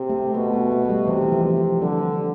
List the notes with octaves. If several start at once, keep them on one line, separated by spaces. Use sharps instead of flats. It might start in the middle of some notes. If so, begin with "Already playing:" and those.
Already playing: C3
A3
B2 A3
B3
A3
A3
G3
C3 E3
E3
F3
C3
F3
D3 G3